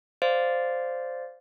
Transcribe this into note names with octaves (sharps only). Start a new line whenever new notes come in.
C5 D5 F5